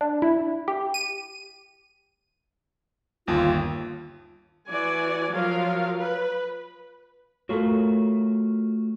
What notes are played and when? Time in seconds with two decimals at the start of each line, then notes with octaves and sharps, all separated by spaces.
0.01 D4
0.22 E4
0.68 G4
0.94 D#7
3.27 G1 D#2 F4
4.68 E3 F#4 D5 G#5
5.31 F3 F#3 F4 A#4 F5
5.97 B4
7.49 A3 F4 F#4 A4 A#4 C#5